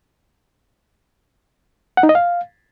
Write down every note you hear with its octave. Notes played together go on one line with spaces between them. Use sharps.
F#5
D#4
D#5
F5